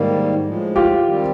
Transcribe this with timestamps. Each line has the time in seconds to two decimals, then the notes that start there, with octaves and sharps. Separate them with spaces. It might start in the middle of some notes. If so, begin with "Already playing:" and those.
Already playing: G#2 D#3 G3 A#3
0.46 A2 F3 G#3
0.76 F4 G4
1.05 D#3 G3 C4